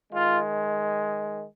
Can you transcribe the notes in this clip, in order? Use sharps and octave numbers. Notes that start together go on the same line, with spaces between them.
D#3 G#3 F4